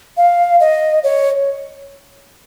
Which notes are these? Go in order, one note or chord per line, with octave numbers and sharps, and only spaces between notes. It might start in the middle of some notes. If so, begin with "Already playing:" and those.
F5
D#5
C#5